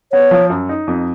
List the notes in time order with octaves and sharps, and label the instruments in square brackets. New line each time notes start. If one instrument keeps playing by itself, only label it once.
[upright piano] B3 [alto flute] C#5
[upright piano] F3
F#2
D#4
F2